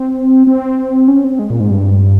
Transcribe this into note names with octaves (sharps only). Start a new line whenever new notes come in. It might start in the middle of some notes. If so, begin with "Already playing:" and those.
Already playing: C4
C4
C#4
C4
G#3
A#2
G#2
G2